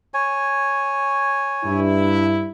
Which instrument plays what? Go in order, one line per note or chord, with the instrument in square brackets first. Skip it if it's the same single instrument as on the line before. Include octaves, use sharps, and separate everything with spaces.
[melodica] C#5 G#5
[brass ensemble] G2 E4